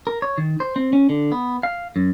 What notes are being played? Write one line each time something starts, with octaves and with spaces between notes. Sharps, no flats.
A#4
C#5
D#3
C5
C4
C#4
D3
B3
F5
F#2